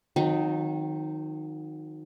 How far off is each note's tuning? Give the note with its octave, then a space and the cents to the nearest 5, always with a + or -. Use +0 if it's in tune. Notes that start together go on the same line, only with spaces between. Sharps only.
D#3 +0 F#3 -35 C4 +15